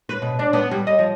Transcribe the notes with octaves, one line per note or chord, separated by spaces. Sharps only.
B4
B2
D4
B3
G3
D#5
F3